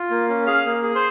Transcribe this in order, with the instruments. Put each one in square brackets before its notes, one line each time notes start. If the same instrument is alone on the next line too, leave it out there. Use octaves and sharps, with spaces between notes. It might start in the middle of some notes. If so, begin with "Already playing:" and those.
Already playing: [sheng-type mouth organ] F4
A#3
C#4
G#4 F5 F6
A#3
G#4
C5 C6